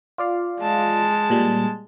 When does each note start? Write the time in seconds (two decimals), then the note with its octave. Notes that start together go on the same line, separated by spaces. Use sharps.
0.18 F4 D5 F5
0.61 G#3 A5
1.30 A#2 G3